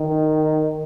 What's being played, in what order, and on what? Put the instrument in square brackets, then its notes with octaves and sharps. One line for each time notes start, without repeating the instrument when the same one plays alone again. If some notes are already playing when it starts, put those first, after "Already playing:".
Already playing: [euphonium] D#3